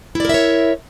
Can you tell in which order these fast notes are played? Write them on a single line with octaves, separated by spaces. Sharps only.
E4 D5 A#4 E5 C#5